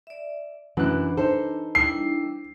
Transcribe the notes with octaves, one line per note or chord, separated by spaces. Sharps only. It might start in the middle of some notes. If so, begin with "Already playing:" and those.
D5 E5
F#2 E3 D4 F#6
D#4 A4 C5
G3 D4 E4 C7